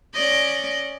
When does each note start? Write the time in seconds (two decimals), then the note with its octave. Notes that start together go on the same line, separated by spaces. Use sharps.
0.14 C#4 D5 D#5